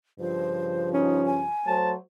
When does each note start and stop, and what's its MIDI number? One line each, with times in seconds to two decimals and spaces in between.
0.20 1.50 43
0.20 1.50 49
0.20 1.50 53
0.20 0.92 72
0.94 1.41 61
0.94 1.24 63
1.26 1.75 80
1.67 1.95 54
1.67 1.95 57
1.67 1.95 72
1.67 1.92 81